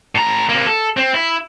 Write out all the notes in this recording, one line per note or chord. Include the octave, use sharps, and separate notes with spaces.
A2 A#5
C3 A#3
A4
C4
E4